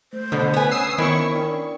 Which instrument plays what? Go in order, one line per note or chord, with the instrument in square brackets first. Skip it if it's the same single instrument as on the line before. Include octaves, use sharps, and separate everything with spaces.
[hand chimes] A3 [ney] C5
[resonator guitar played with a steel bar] B2 [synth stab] D3
[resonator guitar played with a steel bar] B3 G#5 [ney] B4
[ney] C#4 [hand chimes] C5 F#5 [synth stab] D#6 E6 C7
[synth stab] D#3 C#6 [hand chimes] B3 D4 A#4 [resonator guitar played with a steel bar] E4
[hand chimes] D4 D5 G5